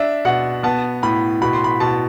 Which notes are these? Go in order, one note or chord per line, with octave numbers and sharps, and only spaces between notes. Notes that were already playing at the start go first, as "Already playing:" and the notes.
Already playing: D4 E5
B2 F#5
B3 A5
A2 B5
B2 B5
C6
B5
B2 A5